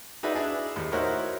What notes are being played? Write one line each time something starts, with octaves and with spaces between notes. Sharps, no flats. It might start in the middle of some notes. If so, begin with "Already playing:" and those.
D#4 F#4 G#4 B4 D5 E5
D4 E4 G#4
D#2 A2
D#4 E4 F#4 A#4 C5 C#5